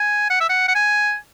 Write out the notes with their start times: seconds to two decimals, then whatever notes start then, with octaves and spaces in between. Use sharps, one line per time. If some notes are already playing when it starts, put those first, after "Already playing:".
Already playing: G#5
0.30 F#5
0.41 E5
0.49 F#5
0.68 F#5
0.75 G#5